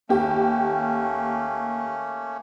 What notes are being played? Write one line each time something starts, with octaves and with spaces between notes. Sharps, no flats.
D#2 A3 A#3 C#4 G4